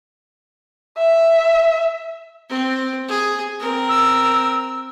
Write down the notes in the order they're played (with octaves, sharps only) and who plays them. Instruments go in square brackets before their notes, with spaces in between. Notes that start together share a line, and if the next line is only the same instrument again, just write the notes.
[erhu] E5
[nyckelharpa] C4
G#4
C4 A#4
[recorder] E6